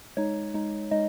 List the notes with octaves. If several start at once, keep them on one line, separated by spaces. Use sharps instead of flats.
G#3 D#4 C#5
G#3 D#4
G#3 D#4 D#5